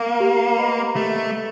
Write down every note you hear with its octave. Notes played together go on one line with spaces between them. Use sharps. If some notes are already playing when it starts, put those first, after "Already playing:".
Already playing: A#3
G4
B4 D#5 F#5 B5
A3 G4